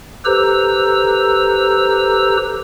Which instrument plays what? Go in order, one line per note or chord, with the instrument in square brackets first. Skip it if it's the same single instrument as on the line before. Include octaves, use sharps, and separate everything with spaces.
[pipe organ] G4 A4 B4 C5 A#5 E6